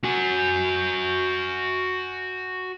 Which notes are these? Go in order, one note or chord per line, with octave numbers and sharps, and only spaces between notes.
F#4 G#5